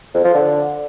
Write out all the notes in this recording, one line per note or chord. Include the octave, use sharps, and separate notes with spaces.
F2
F3
D3